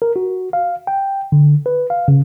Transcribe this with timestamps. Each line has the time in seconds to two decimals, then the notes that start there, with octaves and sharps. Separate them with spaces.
0.02 A#4
0.16 F#4
0.53 F5
0.87 G5
1.32 D3
1.66 B4
1.90 F5
2.08 C#3